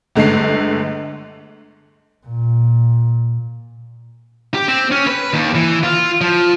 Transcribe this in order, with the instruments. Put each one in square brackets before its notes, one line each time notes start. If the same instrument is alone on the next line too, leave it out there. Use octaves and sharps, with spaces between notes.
[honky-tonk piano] G1 D3 G#3 A3 C7
[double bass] A#2
[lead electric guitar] G4
C4
C#4
B4
D#2
E3
F4
F3